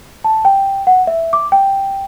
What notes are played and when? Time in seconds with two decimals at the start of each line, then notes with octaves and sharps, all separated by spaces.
0.24 A5
0.45 G5
0.87 F#5
1.07 E5
1.33 D6
1.52 G5